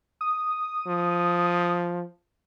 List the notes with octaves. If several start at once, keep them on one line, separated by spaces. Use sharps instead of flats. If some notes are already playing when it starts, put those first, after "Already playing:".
D#6
F3